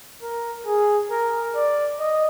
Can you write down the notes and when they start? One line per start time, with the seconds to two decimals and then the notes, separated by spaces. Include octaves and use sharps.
0.22 A#4
0.66 G#4
1.11 A#4
1.55 D5
2.00 D#5